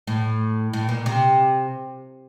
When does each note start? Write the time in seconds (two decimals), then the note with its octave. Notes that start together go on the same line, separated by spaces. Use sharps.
0.07 A2
0.73 A2
0.89 A#2
1.06 C3